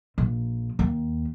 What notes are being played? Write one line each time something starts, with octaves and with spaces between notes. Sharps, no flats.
A#1
D#2